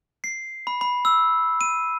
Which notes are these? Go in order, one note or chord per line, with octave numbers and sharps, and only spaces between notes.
C7
B5
B5
E6
D#7